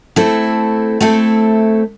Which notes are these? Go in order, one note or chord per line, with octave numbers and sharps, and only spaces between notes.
A3 C4 E4 A4
A3 C4 E4 A4